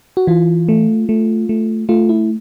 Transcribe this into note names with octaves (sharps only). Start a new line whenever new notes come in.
F#4
E3 F4
A3
A3
A3
A3 F4
E4